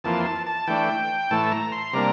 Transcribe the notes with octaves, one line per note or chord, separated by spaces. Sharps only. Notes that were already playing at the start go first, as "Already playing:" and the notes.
F2 E3 A#3 F4 A5
A5
A5
E3 A3 D4 G5
A2 E3 A3 A5
A#5
C6
C3 G3 A#3 D4 A#5